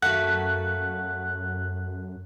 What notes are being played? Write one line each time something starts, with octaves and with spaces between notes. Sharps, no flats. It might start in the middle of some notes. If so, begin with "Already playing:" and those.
F#2 A3 A#3 F#4 F#5 F#6